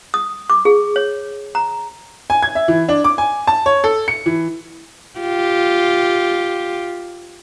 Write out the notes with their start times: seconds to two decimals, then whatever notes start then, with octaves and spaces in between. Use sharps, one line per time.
0.14 D#6
0.50 D6
0.65 G#4
0.96 C#5
1.55 A#5
2.30 G#5
2.43 G#6
2.55 E5
2.68 E3
2.89 D4
3.04 D6
3.18 G#5
3.47 A5
3.66 C#5
3.84 A4
4.08 C#7
4.26 E3
5.19 F4 G4